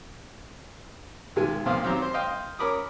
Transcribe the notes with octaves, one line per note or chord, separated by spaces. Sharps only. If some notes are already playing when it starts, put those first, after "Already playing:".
B1 D#3 G#3 G#5
B1 F2 A#3 C5 F5 D#6
D#3 F#3 C4 G4 A#5
C5
D#5 F5 G5 C6
C#4 A#4 B5 D6 D#6